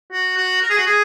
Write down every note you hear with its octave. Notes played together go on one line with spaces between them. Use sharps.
F#4
F#4
A#4
G#4
F#4
G#4